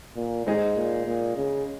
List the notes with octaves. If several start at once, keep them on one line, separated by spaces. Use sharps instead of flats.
A#2
G#2 G#3 D#4 G#4
A#2
A#2
C#3